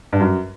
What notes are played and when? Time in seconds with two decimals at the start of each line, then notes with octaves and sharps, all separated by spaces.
0.13 G2
0.20 F#2